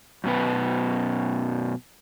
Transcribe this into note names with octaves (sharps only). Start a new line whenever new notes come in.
F#2 B2 B4